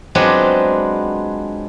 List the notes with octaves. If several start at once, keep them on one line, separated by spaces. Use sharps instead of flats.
F#3 G#3 B3 C4 D4 F4